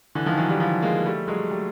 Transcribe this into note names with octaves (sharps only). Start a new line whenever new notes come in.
D3 E3
D#3 F3
E3 F#3
F3 G3
F3 G3
G#3 A#3
G3 A3
F#3 G#3
G3 A3